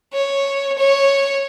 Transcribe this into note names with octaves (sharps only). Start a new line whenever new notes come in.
C#5
C#5